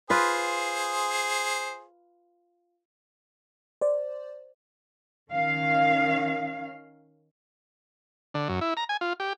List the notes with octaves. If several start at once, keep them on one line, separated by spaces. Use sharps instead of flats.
F4 G#4 B4 C5
C5 D5
D#3 C#4 F5
D3
F#2
E4
A#5
G#5
F4
G4